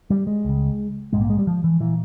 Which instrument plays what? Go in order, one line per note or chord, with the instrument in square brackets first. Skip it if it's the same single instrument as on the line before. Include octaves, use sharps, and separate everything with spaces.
[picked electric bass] G3
G#3
C#2 C#3
A#1 G#2 G#3
A#3
G#3
G3
F3
E3
A#2 E3